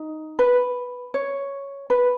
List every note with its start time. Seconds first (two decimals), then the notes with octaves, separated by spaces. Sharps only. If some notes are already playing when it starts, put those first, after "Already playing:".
Already playing: D#4
0.39 B4
1.14 C#5
1.90 B4